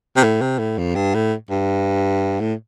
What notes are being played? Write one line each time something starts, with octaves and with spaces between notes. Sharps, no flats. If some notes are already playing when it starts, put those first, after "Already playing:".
C3
A2
C3
A2
F2
G2
A2
G2
A2